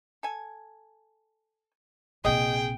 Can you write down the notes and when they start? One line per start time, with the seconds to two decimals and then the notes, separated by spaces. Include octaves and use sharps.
0.23 A4 G#5
2.25 A#1 C3 G#4 D#5 G5